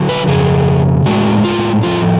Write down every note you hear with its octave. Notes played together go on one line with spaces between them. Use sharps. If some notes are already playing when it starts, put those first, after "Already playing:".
Already playing: D3 F#3
B4
F2 C#3 G#4
A2 G#3 D4 F#4
F4
A2 F3 A3 F4